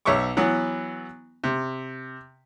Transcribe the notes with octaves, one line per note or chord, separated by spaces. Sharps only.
B1 C#5 E5 C#6 D6
E3 F#3 B3
C3